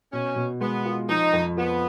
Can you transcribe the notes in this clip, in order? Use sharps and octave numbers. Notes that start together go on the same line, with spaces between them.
B2 C#4
B2
G#3 B3
F4
F3 D#4
F2
F3 B3